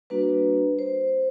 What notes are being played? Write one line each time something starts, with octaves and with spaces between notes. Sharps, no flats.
G3 A#3 D4 F#4 B4
C5